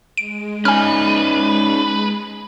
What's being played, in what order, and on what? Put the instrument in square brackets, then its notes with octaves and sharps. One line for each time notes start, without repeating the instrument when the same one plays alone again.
[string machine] G#3 [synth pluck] D7
[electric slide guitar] C#4 D#4 [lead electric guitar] B4 [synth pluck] G#5 F6